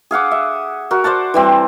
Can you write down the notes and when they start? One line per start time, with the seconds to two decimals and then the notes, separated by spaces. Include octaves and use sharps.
0.11 G#4 F5 F#5 D6
0.31 E5
0.91 F#4 A#4
1.04 C5 D5 F#5 A5
1.34 E3 G3 C4